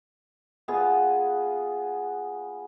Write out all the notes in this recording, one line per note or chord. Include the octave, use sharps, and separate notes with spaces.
B3 F4 G#4